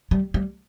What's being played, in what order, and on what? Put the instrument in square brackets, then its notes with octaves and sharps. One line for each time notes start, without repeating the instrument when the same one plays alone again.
[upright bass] G3
G3